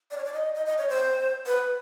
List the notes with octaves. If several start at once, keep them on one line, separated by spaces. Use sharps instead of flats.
D5
C#5
D5
D#5
D#5
D#5
C#5
C5
B4